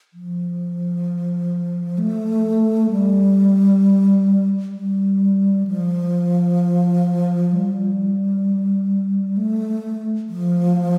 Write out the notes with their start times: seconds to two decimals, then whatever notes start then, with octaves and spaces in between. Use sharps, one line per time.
0.14 F3
1.98 A3
2.90 G3
4.75 G3
5.67 F3
7.52 G3
9.37 A3
10.29 F3